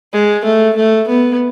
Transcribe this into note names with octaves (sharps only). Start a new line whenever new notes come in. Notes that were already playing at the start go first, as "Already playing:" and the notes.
G#3
A3
A3
B3